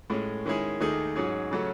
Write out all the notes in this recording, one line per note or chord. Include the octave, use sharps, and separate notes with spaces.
A2 G#3 C#4
D#3 G#3 C#4 E4 G#4
D#2 D#3 A3 D#4 G#4
G#2 F#3 C#4 G#4
C#3 F#3 A3 C#4